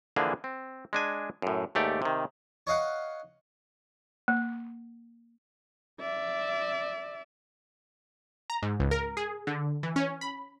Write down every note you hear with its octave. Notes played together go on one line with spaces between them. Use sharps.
D3 E3 F3 A#3 G#4
C4
G#3 D4 G#5
F#2 A2
D#2 G#2 A3 G4 D5
C3 D#3
C#5 D#5 F5 F#5
A#3
D5 E5
A#5
G#2
C#2
A#4
G#4
D3
E3
C#4
B5